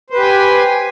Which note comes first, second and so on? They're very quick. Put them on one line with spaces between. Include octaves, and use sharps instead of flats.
C5 B4 G4 G5 G#5